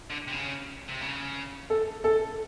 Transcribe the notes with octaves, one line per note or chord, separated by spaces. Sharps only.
D3
C3
C#3
C3
C#3
A4
A4